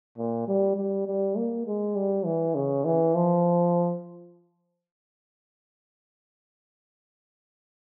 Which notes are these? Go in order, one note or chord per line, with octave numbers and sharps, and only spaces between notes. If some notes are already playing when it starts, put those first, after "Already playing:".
A#2
G3
G3
G3
A#3
G#3
G3
E3
C#3
E3
F3